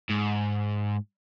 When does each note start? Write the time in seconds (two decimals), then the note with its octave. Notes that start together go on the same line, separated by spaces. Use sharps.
0.10 G#2